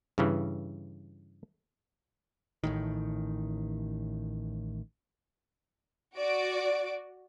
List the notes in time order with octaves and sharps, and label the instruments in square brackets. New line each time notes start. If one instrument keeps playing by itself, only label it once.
[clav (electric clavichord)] G2 C#3 E3
[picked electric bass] A1 A2 D#3
[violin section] F#4 D5 D7